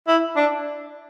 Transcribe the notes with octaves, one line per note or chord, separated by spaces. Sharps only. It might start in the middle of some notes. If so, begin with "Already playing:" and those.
E4
D4